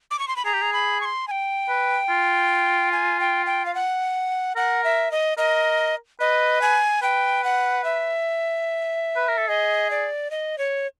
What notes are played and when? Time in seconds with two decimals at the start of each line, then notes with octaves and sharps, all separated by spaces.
0.11 D6
0.19 C#6
0.28 C6
0.36 B5
0.45 G#4 A#5
0.54 G4
0.62 G#4
0.73 B5
1.01 C#6
1.05 C6
1.28 G#5
1.31 G5
1.69 B4
2.09 F4
2.92 G#5
3.20 G5
3.46 G5
3.66 F5
3.75 F#5
4.56 A#4 F#5
4.84 E5
5.11 D#5
5.38 A#4 D#5
6.20 B4 D#5
6.61 G#5
7.02 B4 G5
7.44 F#5
7.84 E5
9.16 B4
9.28 A#4
9.38 A4
9.48 G#4 D#5
9.90 D5
10.31 D#5
10.58 C#5